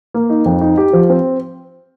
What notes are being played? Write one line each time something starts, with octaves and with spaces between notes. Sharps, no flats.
A#3
D#4
F2
D#4
G4
F3
C4